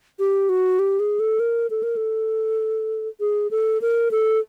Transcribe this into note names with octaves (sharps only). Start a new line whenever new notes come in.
G4
F#4
G4
G#4
A4
A#4
A4
A#4
A4
G#4
A4
A#4
A4